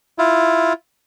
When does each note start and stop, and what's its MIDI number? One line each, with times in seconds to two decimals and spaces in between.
0.18 0.73 64
0.18 0.73 65